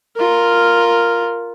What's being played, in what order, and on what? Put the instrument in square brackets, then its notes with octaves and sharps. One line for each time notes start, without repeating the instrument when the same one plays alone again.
[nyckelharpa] F4 A#4